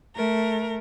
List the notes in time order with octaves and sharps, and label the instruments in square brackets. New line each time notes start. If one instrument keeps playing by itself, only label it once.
[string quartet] A3 A#4